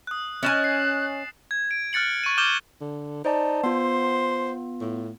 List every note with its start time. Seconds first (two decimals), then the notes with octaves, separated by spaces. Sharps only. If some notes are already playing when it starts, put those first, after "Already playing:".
0.07 D#6 F#6
0.43 C#4 D#5 G#5 D#6 F#6 A6 E7
0.64 C7
1.51 G#6
1.71 D7
1.93 F6 F#6 A6 C#7 F#7
2.24 C#6 D#7
2.38 D6 F6 G6 E7 G7
2.81 D3
3.25 D#4 C5 D5 A5
3.63 B3 F4 C5
4.81 A2